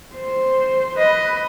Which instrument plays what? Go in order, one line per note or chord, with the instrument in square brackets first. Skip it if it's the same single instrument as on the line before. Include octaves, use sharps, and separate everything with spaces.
[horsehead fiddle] C5
[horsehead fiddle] B4 [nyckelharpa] D#5